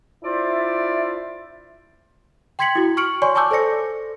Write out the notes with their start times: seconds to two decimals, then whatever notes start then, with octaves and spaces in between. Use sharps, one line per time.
0.23 D4 E4 F4 C5 D5 E5
2.59 G5 C6 G#6 B6 C#7 F#7
2.75 E4 F#4
2.97 C#6 F6 C#7 D7 F#7
3.22 C#5 D5 G#5 C6 C#6
3.35 G#5 A5 C#6 D6 E6 G6
3.51 A4 C5 D5 A#6 C#7